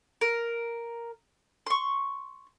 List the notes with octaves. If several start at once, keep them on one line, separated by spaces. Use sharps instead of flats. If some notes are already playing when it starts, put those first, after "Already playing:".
A#4
C6 C#6